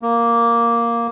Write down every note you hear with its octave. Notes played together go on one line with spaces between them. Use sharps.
A#3